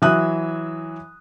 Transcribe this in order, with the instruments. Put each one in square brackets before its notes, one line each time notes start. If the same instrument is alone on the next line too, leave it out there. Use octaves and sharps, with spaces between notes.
[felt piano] E3 F#3 E5 D#6 F#6